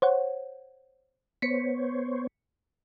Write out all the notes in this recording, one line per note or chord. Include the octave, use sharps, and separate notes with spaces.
C5 C#5 F#5
B3 C5 C#5 B6 C#7